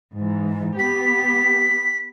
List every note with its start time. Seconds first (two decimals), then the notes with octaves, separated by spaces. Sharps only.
0.15 G#2 E3
0.79 B3 G4 B6